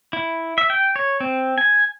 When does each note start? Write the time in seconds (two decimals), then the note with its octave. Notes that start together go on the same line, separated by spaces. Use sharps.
0.13 E4
0.58 E5
0.70 G5
0.96 C#5
1.20 C4
1.58 G#5